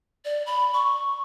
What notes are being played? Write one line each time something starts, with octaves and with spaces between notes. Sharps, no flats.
D5
B5
C#6